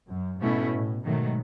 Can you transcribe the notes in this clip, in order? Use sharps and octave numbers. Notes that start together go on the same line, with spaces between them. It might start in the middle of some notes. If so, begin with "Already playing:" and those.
F#2
G#2 B2 A3 C#4 E4
A2
G#2 B2 D#3 F#3 A3